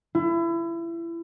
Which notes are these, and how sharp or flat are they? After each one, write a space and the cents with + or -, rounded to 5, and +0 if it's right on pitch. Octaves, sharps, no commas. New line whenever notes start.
E4 +30